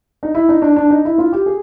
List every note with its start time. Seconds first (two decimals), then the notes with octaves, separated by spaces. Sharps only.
0.23 D#4
0.35 E4
0.49 D#4
0.62 D4
0.76 D4
0.90 D#4
1.05 E4
1.18 F4
1.33 G4
1.46 G#4